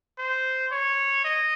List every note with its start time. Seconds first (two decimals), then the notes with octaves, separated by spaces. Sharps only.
0.19 C5
0.72 C#5
1.25 D#5